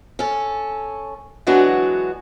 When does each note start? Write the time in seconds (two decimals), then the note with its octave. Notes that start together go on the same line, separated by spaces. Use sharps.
0.19 C#4 A4
1.47 E3 F#3 G#3 B3 D4 F#4